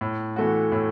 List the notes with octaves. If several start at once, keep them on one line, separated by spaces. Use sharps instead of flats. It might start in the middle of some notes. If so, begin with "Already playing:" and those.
A2
E3 A3 F#4
A2